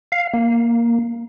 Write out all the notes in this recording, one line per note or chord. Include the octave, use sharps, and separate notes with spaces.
F5
A#3